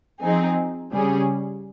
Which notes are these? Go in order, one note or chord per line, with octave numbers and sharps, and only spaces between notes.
F3 C4 D#4 G#4
C#3 G3 C#4 G#4